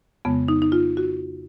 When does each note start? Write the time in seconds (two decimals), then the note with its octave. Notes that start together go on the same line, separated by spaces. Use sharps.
0.25 F2 C#3 G#3 B3
0.48 D#4
0.62 D#4
0.72 F4
0.97 F#4